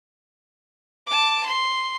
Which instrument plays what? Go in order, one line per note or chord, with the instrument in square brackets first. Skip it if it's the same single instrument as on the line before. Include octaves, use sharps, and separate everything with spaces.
[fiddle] A5 D6
C6